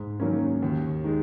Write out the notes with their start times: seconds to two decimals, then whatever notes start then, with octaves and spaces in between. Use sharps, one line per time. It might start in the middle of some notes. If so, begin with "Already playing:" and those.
Already playing: G#2 G#4
0.20 D#3 F#3 A#3 C#4
0.62 D#2
1.04 D#3 G#3